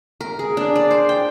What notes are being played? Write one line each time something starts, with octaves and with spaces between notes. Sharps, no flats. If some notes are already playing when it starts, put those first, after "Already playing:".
A#4
G#4
D4
D5
C5
G5